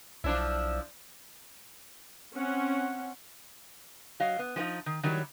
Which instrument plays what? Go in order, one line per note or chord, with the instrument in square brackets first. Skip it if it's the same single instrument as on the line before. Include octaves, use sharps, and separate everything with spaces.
[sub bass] B1 [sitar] F3 D4 E4
[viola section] C4 C#4 F#5
[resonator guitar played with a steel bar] F#3 D#5 F5
B3
F3 G#3 B3 D#4 F4
D#3
D#3 F#3 G3 E4 C#5